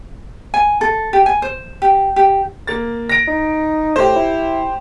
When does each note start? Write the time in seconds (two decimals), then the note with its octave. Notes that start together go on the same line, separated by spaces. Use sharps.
0.54 G#5
0.81 A4
1.13 G4
1.26 G#5
1.42 C5
1.82 G4
2.16 G4
2.67 A#3 A6
3.09 A#6 D7
3.28 D#4
3.96 A2 G4 C5
4.16 E4